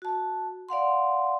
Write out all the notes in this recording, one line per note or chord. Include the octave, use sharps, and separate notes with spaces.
F#4 A5
D5 F5 F#5 C6